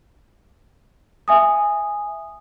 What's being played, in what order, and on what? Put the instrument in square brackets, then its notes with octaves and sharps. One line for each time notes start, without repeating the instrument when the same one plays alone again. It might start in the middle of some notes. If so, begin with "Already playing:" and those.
[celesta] E5 G#5 D#6